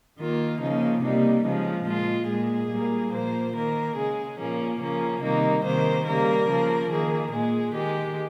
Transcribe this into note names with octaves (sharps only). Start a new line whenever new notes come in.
D#3 A#3 F4
C#3 F3 A#3 D#4
C3 G3 A#3 D#4
C#3 F3 G#3
A#2 G#3 F4
A#2 G#3 G#4
A#2 G3 A#3
A#2 F3 A#3 C5
D#3 A#3 A#4
C#3 G#3 G#4
A#2 F3 A#3 C#4
C#3 F3 A#3 C#4
C3 D#3 G3 A#3 D#4
C3 D#3 A#3 C5
C#3 G3 A#3 A#4
C#3 F3 A#3
D#3 A#3 G#4
A#2 G#3 G#4
D#3 G#3 G4